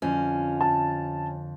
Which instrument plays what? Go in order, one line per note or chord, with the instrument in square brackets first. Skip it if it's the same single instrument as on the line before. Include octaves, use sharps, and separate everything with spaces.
[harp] F2 D3 [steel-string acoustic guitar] C#4
[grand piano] A5